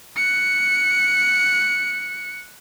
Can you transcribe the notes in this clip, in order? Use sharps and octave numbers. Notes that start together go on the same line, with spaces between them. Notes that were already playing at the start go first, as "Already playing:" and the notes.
F#6 C#7